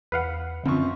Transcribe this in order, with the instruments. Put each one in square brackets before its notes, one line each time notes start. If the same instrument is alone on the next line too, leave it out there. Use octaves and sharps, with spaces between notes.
[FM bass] E2 [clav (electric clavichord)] B4 F5 F#5
[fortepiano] F#2 F3 C#6 [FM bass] D3 [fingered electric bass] C4